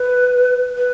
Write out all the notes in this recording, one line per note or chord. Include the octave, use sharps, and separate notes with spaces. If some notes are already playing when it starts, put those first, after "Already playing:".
Already playing: B4
B4